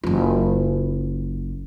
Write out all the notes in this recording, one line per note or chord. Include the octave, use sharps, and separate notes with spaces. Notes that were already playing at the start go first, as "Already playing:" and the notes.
F#1 F4